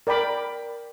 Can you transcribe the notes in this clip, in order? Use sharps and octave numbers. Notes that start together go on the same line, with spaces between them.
A#4 D5 G5 B5 D6